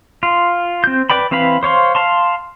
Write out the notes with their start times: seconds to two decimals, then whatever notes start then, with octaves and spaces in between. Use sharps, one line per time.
0.23 F4
0.84 C4 G6
1.10 B4 D5 G5 B5
1.31 E3 C4 B4 F5 B5
1.63 C5 C#5 F5 C6
1.95 F5 A5 C6